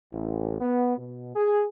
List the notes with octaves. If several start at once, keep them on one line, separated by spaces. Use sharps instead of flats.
A1
B3
B2
G#4